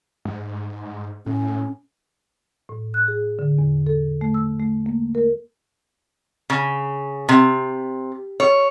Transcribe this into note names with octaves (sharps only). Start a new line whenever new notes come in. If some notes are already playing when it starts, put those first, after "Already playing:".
G#2
A2 C#4
A2
F#6
G#4
D3
E2
A4
A3
E6
A3
A#3
A#4
C#3
C3
C#5